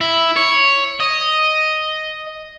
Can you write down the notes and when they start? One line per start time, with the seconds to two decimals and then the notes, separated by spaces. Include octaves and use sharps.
0.01 E4
0.37 C#5
1.00 D#5